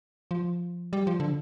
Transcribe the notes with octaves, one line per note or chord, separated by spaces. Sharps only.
F3
G3
F3
D3